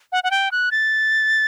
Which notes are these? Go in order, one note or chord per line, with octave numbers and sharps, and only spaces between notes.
F#5
F#5
G5
F#6
A6